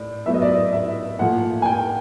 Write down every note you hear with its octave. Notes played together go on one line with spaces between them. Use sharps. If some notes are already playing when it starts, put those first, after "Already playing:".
Already playing: A2 D5
A2 F#3 B3 E5
D#5
D5
D#5
E5
A#2 F3 A3 F#5
G#5
G5